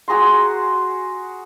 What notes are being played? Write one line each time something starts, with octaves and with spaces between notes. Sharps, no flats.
F#4 G#4 A#5 C6